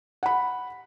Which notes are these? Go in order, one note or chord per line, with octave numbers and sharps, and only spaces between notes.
F#5 B5